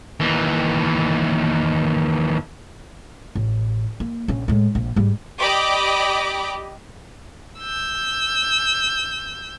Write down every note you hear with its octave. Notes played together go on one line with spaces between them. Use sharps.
D#2 E3
A1
A#3
A#1 C#4
A2 G#3
A#1
G#2 G3
G4 D5 D#5 B5 D6
E6 G6